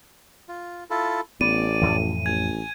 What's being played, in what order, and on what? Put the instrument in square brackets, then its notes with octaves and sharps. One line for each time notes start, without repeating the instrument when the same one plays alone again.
[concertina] F4
E4 F4 A4
[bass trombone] A1 [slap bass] B3 [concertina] D5 [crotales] D#7
[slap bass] F2 A2 E3
[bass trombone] A1 [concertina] G#5 [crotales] G#6